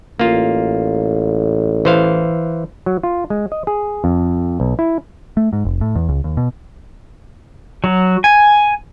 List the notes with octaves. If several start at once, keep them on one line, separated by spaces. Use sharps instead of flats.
A1 A#3 F4
E3 C5 F5
F#3
F4
G#3
D#5
G#4
F2
B1
E4
A3
G#2
F1
A2
E2
C#2
D#2
B2
F#3
G#5